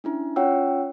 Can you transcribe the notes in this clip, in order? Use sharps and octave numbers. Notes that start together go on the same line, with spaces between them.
C#4 D4 E4
C#4 F4 C#5 F#5 G5 E6